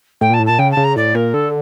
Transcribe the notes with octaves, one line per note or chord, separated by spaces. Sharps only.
A2 G5
A#2 A5
A2
A#2 A5
C#3 G5
A5
C#3
A#5
A2 D5
A#2 A#4
D3 A4